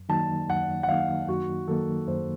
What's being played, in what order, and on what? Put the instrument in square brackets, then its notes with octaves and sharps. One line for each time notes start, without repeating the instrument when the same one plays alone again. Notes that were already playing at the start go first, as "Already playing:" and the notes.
Already playing: [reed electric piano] F#2
[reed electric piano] D#3 F#3 A#3 D#4 [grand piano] A5
[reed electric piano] F#2 [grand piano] F#5
[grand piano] F#5
[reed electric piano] D#3 F#3 A#3 D#4 [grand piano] F5
[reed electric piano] F#2 [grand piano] F#4
[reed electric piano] D#3 F#3 A#3 D#4 [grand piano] A4
[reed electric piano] F#2 [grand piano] C5